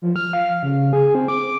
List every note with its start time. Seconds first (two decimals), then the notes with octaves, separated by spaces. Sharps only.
0.02 F3
0.16 F6
0.33 F5
0.63 C#3
0.93 G#4
1.15 C4
1.28 D6